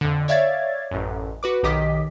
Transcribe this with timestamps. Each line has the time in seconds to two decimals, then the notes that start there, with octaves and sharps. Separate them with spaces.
0.01 F2 D3
0.28 C#5 D5 E5 F5 G#6 A6
0.91 A1 F#2
1.43 F#4 B4 D6
1.63 B1 D#3 G4 D#5 D6 B6